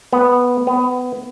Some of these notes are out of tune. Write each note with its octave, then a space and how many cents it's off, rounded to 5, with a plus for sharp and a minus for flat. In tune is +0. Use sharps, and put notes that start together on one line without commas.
B3 -5
B3 +20